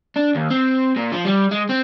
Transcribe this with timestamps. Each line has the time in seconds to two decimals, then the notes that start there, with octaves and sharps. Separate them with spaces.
0.16 D4
0.35 D#2
0.50 C4
0.96 A#2
1.12 F3
1.25 G3
1.51 G#3
1.69 C4